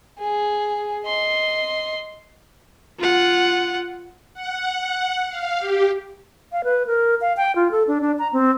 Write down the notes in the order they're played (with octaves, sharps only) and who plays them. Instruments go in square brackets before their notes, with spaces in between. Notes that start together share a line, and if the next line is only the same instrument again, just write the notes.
[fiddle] G#4
D#5 C6
[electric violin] F4 F#5
[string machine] F#5
F5
G4
[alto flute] F5
B4
A#4
F5
G5
F4
A4
D4
D4
A#5
C4